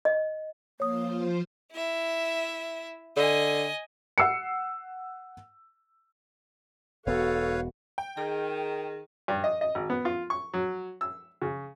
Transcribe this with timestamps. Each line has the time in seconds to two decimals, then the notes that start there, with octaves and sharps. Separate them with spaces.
0.05 D#5
0.80 F3 A#3 F4 C5 C#5 D#6
1.72 E4 E5
3.17 D3 D#5 G#5
4.18 F#5 E6 C7 C#7
7.06 E1 B3 F#4 A4 B4 C#5 F5
7.98 G5
8.17 D#3 G#4
9.28 G2
9.44 D#5
9.61 D#5
9.75 G#1
9.90 B3
10.05 F4
10.30 C#6
10.54 F#3
11.01 E6
11.42 C#3